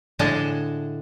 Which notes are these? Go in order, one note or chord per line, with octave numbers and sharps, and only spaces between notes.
A2 D3 G#3 A5